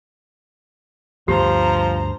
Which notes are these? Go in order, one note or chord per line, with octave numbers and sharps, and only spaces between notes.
D2 G2 F3 G4 C5 A#5